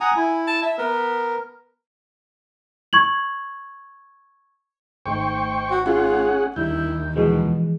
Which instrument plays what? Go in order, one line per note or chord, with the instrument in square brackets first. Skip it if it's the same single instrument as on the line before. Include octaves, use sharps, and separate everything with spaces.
[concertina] F#5 A#5 D#6 [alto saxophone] G#5
[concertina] E4
[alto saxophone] A5
E5
[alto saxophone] B3 [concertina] A#4
[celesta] C#6 G#6 F#7
[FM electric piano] G#1 A3 D#4 [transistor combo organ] C5 G5 C#6
[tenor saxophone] F#4
[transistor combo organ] C#4 G#4 F#5 [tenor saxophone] F4
[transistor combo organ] D#2 [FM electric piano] G3 D4 G6 [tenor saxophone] E4
[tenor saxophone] B2 [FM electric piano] E3 F3 G#3